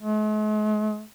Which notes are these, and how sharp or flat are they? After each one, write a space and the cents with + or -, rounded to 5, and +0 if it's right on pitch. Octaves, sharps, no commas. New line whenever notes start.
G#3 +45